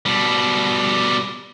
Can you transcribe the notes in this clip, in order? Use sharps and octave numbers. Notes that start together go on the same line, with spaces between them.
B2 G3